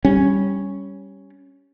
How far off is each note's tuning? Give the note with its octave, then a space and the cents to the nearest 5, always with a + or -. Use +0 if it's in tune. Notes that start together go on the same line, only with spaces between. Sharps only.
G3 +0 C#4 +0